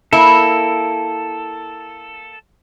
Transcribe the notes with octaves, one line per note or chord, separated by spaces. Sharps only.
A#3 E4 A4